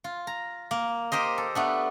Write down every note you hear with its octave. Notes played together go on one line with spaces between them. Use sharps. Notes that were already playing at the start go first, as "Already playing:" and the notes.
F4
A#5
A#3
G4 A#4 C5 D#5
A4
A3 B3 D4